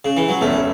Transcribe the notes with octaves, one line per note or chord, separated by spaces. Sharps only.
C#3
E3
F#3
E1 E2 E3 A3 C#4 E4